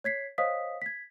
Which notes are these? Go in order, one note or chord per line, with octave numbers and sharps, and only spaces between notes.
C#5 G#6 B6 C7
C5 C#5 D#5 F5 D#6 B6
G#6 B6